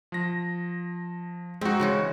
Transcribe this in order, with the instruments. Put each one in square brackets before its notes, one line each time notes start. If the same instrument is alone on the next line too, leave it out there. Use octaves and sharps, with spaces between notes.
[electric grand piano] F3 A#6
[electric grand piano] G#3 F#4 [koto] C4 D#4
[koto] C#3 E3 C#4